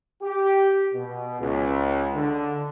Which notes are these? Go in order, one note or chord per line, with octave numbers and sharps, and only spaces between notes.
G4
B2
C#2
D3